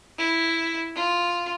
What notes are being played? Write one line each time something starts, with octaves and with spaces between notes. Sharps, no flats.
E4
F4